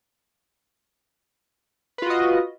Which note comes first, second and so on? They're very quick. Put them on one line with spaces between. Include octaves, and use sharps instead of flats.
B4 F4 F#4 D#5